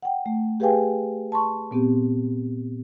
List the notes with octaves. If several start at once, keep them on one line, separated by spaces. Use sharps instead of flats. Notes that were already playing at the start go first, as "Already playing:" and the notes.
F#5 G5
A3
G4 G#4 B4 F5 G5 G#5
A5 C6 C#6
A#2 B3 C4 G4